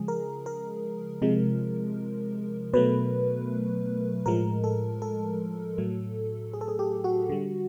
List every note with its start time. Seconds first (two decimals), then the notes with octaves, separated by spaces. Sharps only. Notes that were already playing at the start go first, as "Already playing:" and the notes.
Already playing: C#3 F3 G#3 G#4
0.08 A#4
0.46 A#4
1.22 C3 F3 G#3
2.74 B2 F#3 A3 B4
4.26 A2 F3 G#3 A#4
4.64 A4
5.02 A4
5.78 A2 F#3 A3
6.53 G#4
6.61 A4
6.68 G#4
6.79 G4
7.04 F#4
7.29 D3 G3